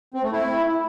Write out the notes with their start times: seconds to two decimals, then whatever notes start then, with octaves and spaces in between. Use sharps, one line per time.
0.14 C4
0.23 A3
0.32 E4